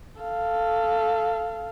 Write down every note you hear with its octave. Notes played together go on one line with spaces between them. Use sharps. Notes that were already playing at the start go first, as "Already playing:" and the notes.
A4 F5